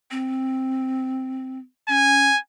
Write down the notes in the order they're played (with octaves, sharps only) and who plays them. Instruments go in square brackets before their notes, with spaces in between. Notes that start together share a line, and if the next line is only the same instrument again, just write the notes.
[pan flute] C4
[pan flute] C#4 [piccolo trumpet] G#5